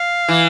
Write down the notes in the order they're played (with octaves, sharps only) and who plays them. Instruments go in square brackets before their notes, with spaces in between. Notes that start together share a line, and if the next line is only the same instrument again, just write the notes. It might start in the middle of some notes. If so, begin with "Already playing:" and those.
Already playing: [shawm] F5
[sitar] E3